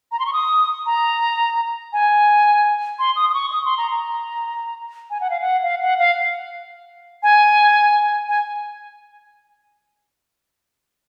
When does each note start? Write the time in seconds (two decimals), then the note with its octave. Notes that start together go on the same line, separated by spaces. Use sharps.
0.12 A#5
0.19 C6
0.26 C#6
0.33 D#6
0.86 A#5
1.93 G#5
2.99 C6
3.16 D#6
3.29 D#6
3.34 C#6
3.52 D#6
3.65 C6
3.78 A#5
3.91 A#5
5.10 G#5
5.21 F#5
5.30 F5
5.41 F#5
5.63 F5
5.82 F#5
5.99 F5
7.23 G#5
8.28 G#5